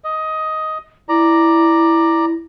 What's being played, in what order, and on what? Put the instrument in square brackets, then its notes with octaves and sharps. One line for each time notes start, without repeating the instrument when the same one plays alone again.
[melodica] D#5
[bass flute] E4 [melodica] D5 A#5